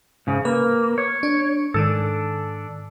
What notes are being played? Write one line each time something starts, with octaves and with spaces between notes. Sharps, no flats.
G#2 C#3
A#3 B4
C#5
D4
G#2 D#3 D4 A4